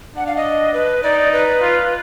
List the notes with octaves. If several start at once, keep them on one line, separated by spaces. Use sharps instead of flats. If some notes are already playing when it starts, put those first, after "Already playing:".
D4 F#5
F5
D#5
B4
D#4 D5
B4
F4